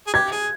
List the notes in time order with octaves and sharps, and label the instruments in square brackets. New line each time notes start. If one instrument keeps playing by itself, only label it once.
[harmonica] G#4
[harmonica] G4 [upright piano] G#6
[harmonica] G#4